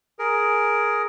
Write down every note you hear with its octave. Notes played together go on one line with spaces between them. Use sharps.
G#4 A#4